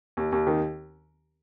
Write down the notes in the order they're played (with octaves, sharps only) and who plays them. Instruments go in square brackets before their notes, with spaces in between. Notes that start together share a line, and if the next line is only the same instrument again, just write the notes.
[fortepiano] D#2
D#2
D#3